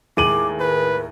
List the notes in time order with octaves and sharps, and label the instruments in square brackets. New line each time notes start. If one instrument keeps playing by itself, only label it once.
[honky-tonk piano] D#2 A2 G#3 [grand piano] G#4 D#7 F#7 [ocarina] D6
[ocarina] A#4 [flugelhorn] B4